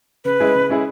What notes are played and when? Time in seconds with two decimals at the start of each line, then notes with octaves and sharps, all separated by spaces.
0.25 C#3 B4
0.40 G#3 C#4 E4 G#4
0.55 C#3
0.69 G#3 C#4 E4 G#4